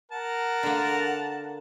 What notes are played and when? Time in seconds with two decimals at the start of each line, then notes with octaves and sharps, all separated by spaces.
0.12 A#4 F#5 A5
0.63 D3 A#3